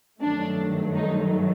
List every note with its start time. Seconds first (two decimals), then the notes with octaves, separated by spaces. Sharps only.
0.20 G2 D#3 F#3 A3 D4
0.95 D#4